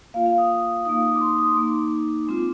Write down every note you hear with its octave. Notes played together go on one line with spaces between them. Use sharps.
A#3 F4 F5
F5
D#6
A#3 D#4 D#6
D#6
D6
C6
D#6
A#3 D#4 D6
G#3 C4 F4